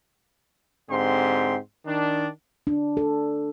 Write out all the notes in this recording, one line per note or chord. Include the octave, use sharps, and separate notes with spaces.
G#2 D3 C4 G4 C6
D#3 D4
D4
A4